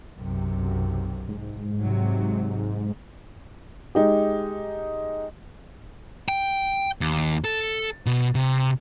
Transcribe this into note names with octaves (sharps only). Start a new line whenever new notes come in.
B1 F#2 C3
G#2
C3 F#3
G#3 D#4 G4
G5
D#2
A4
B2
C3